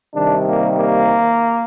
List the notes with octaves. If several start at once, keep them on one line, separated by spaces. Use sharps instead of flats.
C3 D#3 G3 D4
A#3
A#3